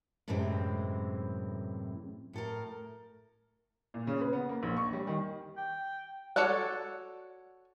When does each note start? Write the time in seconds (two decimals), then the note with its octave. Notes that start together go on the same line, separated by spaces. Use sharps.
0.28 F#2 A2 C3 E3 G#3 C4
2.33 A2 A4 A#4
3.94 A#2
4.07 C#3
4.21 B4
4.33 B3
4.49 A#3
4.63 A#1
4.77 C#6
4.93 G3
5.07 D#3
5.57 G5
6.36 F#4 A4 C#5 D5 F#5